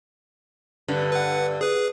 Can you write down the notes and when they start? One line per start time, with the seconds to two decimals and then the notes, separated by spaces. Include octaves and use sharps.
0.88 G2 D3
1.12 B4 F#5
1.61 G#4 B4